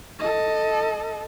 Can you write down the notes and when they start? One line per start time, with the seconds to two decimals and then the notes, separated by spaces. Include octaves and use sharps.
0.20 A4 D#5